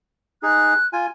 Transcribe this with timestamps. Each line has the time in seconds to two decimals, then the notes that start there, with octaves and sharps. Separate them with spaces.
0.43 D#4 G#4 F#6
0.93 F4 G#5